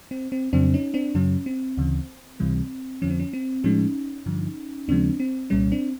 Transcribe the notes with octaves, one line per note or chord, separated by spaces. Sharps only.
C4
C4
F2 C#3 F#3 C4 D4
C#4 D#4
C4 D4
F#2 C#3 F#3 C#4
C4
D2 C#3 E3
C#2 C3 E3 G3
F2 D3 F3 C#4
C4
C#4
C4
A2 F3 G#3 C#4 D#4
G2 D3 F3
D#2 C#3 F3 G#3 C4 D4
C4
C2 A#2 G3 C#4
C4 D4